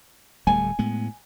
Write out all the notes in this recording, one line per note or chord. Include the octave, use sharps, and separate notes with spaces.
D1 G3 A3 G#5
A2 G#3 B3